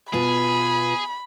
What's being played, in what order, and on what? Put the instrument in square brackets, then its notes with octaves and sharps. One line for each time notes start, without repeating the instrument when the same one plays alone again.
[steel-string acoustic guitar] B2 F4 B4 [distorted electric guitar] G#4 [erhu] B5